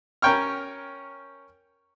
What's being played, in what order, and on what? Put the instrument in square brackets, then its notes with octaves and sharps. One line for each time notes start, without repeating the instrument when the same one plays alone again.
[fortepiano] C#4 A#4 C#5 G5 C#6 F6